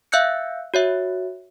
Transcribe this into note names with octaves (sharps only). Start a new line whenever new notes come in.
E5 F5 E6 F#6 G6 C#7
F#4 C#5 E5